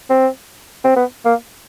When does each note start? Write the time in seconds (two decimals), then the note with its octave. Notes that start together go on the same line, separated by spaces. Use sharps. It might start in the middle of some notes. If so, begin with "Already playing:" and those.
0.10 C4
0.85 C4
0.96 B3
1.25 A#3